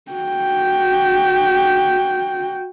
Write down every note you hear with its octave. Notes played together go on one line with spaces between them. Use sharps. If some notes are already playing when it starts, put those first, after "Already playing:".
F#4 G5